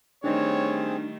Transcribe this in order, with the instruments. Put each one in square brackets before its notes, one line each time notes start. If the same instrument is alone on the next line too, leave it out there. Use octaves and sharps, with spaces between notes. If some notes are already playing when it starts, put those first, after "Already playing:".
[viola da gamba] D#3 G3 A3 [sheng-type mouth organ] C4 G#4 [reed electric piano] D4 D#4 [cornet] C#5